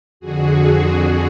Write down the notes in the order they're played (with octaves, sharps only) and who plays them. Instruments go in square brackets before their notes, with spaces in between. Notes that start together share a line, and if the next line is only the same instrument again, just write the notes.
[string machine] F2 D3 F#4 G#4